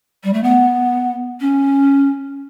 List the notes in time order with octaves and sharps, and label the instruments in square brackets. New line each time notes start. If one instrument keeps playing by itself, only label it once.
[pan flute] G3
A3
B3
C#4